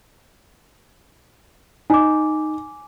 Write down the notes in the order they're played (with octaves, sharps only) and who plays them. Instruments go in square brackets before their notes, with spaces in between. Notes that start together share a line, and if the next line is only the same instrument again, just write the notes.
[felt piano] D#4 [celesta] G#5 D6